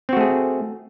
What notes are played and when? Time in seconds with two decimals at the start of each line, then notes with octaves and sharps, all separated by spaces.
0.09 C4
0.13 F#4
0.17 A3
0.21 G#4